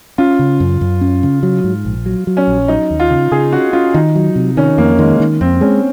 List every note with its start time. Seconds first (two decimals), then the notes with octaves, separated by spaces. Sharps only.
0.18 C#4 F4
0.39 C#3
0.60 F#2
0.81 F#2
1.01 C#4
1.23 C#3
1.43 F#3
1.64 G#2
1.85 A#1
2.06 F#3
2.27 F#3
2.37 C#4
2.48 A#1
2.68 F#3 D#4
2.90 D#2
3.00 F4
3.11 C#3
3.31 C#3 G#4
3.52 C#4 F#4
3.73 C#4 F4
3.94 D#3 D#4
4.16 F#3
4.36 C3
4.57 D#3 C#4
4.78 F2 A#3
4.99 D#3 G#3
5.20 D#3
5.41 F2 C4
5.61 G#3 C#4